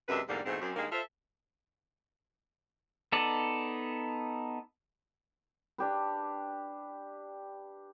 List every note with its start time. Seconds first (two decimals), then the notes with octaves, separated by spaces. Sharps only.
0.09 F#2 C3 G#3 D4 B4 E5
0.28 E2 G#2 D3 G3 A#3 D4
0.46 G#2 B2 E3 A3 C4
0.61 F#2 C4
0.76 G2 D#3 G#3 A#3
0.92 F4 A4 C5 E5
3.12 B3 D#4 A4 D5
5.78 D4 G4 B4